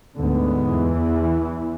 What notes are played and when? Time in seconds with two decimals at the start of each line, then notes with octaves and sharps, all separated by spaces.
0.16 D2 G#2 D3 G#3 B3
0.64 E2 E3